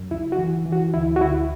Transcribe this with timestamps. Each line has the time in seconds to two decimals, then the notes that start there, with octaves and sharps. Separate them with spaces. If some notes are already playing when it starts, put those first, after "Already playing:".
Already playing: F#2
0.11 C#2 E4
0.32 F#4
0.38 E3
0.66 E3
0.72 F#4
0.94 D2 E4
1.16 F#4
1.21 D2 E4